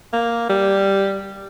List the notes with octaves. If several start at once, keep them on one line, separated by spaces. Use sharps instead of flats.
A#3
G3